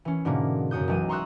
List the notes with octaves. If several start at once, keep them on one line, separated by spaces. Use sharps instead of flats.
E3 C#4
G#2 B2 D3 A#3
F#2 C#3 F#4 D#6 G6
B1 E3 F#3 G#3 D#7
A#5 C6 C#6 D#6 E6 F#6